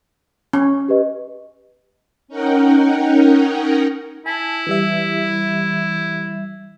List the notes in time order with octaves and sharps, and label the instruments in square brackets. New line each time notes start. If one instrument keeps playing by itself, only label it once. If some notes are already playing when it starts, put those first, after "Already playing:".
[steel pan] C#4
[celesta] G4 B4 D#5
[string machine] C#4 D#4 A#4 F#5 G5
[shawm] E4 [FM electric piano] G#5 A5
[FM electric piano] E3 G3 E5